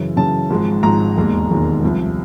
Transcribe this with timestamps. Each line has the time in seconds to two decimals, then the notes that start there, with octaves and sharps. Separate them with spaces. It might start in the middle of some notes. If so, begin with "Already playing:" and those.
Already playing: F#2 C#3 E3
0.16 F#2 C#3 E3 A5
0.50 G#1 G#2 F3 G#3
0.83 G#1 G#2 F3 G#3 A#5
1.17 E1 D#2 D#3 G#3
1.50 E1 D#2 D#3 G#3
1.83 C2 C3 F3